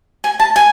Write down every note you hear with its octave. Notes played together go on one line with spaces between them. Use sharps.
G#5
A5
G#5